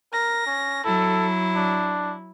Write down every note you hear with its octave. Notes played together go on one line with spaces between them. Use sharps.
A#4 A#6
C#4
F#3 E4 A4
D4